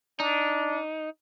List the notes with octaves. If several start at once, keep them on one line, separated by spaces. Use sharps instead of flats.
D4 D#4